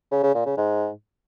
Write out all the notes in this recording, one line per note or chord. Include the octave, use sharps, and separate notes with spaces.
C#3
C#3
A#2
C#3
G#2